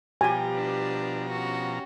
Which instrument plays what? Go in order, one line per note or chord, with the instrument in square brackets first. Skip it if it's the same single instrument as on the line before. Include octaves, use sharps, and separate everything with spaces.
[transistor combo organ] B2 F3 A#5 [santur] G3 G4 [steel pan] G#5
[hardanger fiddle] D4 B4
C#4 F#4